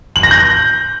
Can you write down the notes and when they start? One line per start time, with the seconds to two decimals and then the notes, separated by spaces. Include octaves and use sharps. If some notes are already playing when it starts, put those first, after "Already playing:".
0.16 F#7
0.23 A#6
0.31 G6